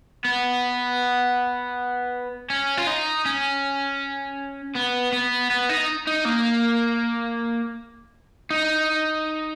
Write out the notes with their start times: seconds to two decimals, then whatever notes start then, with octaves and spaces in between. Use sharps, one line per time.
0.25 B3
2.50 C#4
2.77 F4
2.87 D#4
3.26 C#4
4.76 B3
5.13 B3
5.50 B3
5.69 D#4
6.07 D#4
6.25 A#3
8.50 D#4